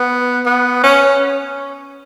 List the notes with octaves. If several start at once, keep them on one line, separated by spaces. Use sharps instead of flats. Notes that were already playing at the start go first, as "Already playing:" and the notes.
Already playing: B3
B3
C#4